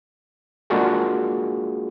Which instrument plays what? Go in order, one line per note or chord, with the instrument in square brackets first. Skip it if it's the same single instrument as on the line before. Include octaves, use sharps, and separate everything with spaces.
[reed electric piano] G#3 A#3 D4 F4 F#4 G#4